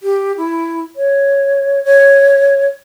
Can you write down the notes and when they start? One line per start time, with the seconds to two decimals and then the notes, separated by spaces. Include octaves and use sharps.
0.03 G4
0.37 E4
0.96 C#5
1.84 C#5